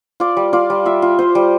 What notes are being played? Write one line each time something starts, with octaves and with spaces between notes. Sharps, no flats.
F4 D5
G3
F4 D5
G3
F4 E5
F4
F4 C5
G3